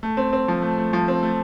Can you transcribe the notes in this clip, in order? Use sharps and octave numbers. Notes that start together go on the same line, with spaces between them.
A3
C4
C4
F3
A3
A3
F3
C4
A3